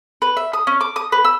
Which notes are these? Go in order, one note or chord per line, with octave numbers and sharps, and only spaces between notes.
B4
E5
D#6
C#4
D6
D#6
B4
E6